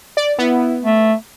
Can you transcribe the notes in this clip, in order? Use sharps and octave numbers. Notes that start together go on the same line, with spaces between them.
D5
B3 E4
A3